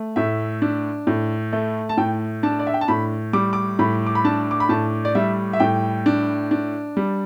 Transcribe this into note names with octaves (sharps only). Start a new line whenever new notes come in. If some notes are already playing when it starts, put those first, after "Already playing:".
Already playing: A3
A2 E5
D4
A2
A3
A5
A2 G5
D4 A5
D5
E5
G5
A5
A2 B5
G3 D6
D6
A2 B5
D6
B5
D4 A5
D6
B5
A2 A5
D5
G3 E5
E5
A2 G5
D4
D4
G3